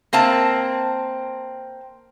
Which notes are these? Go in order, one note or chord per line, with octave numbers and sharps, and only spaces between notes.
A#3 C4 E5 A5